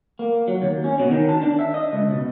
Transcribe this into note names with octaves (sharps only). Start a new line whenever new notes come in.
A#3
F#3
D#2
C#4
B2
D#3
A5
D4
E5
D#5
C#2
B2